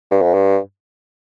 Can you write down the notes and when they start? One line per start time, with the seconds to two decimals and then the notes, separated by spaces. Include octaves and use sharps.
0.11 G2
0.22 F2
0.34 G2